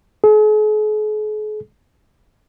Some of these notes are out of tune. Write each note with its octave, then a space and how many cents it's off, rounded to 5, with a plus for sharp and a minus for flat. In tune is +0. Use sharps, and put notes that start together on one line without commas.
G#4 +45